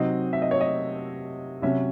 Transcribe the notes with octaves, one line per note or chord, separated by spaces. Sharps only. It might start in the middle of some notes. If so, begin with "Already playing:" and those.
Already playing: C3 F#3 C4 D#4 D#5
E5
D#5
C#5
D#5
C3 F#3 C#4 E5